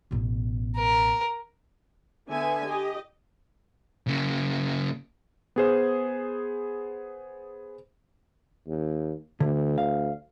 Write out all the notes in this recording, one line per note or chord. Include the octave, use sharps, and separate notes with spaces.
A1 B2
A#4
D3 B3 E5 G#5
G4 D#5
C#3 A#3
B3 G#4 C5
D#2
D2 D3
F5